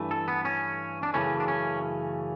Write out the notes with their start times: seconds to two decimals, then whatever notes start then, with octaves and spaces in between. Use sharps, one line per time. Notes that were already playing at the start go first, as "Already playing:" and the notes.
Already playing: G2 E3 A3
0.11 A4
0.28 B3
0.45 C#4
1.03 D4
1.14 F#2 C#3 E3 A3 C#4
1.40 D4
1.48 C#4